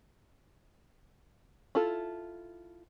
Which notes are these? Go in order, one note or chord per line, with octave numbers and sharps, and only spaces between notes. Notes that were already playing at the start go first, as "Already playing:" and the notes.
E4 F4 A4